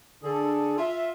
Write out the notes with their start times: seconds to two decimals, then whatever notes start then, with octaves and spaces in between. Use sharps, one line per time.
0.22 D3 G#4 A4
0.78 F4 E5